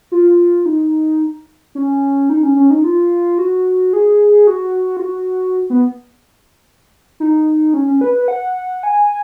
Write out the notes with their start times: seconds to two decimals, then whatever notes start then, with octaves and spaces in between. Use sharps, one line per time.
0.12 F4
0.66 D#4
1.75 C#4
2.30 D#4
2.43 C#4
2.56 C#4
2.70 D#4
2.84 F4
3.38 F#4
3.93 G#4
4.47 F#4
4.97 F4
5.02 F#4
5.70 B3
7.20 D#4
7.74 C#4
7.87 C#4
8.01 B4
8.15 B4
8.28 F#5
8.83 G#5